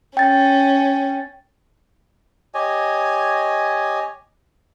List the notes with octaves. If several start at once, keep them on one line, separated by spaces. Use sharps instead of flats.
C#4 G5 A6
G4 C#5 D#5 G#5